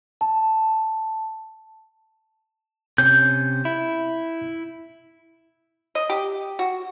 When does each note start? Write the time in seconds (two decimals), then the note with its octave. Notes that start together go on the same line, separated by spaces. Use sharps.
0.21 A5
2.98 C3 C#4 G6
3.65 E4
5.95 D#5
6.10 G4
6.59 F#4